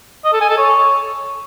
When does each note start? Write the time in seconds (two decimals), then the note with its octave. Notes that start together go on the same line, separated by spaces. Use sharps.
0.24 D#5
0.33 A4
0.41 G#5
0.49 A4
0.57 C#5